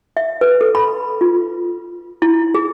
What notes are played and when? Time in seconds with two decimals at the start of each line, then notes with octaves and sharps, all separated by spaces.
0.17 E5
0.41 B4
0.61 A4
0.75 B5
1.21 F4
2.22 E4
2.55 G#4